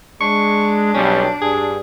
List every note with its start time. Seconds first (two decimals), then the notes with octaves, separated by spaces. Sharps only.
0.21 G#3 D4 C#6
0.94 B1 G3 C#4
1.42 G2 G#4